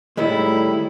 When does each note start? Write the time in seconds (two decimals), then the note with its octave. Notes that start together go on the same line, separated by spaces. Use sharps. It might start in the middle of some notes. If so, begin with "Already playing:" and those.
0.17 A2 D#3 G3 G#3 E4